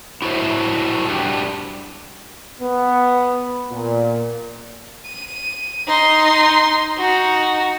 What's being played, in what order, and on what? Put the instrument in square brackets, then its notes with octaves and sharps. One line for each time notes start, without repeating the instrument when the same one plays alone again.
[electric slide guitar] E4 F#4 A4 C5 C#5 E5
G3 D4 F#4 G4
[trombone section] B3
A#2
[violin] D#7
D#4 C6
D#4 F#4